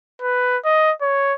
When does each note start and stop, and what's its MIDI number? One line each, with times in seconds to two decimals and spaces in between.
0.22 0.58 71
0.65 0.93 75
1.02 1.34 73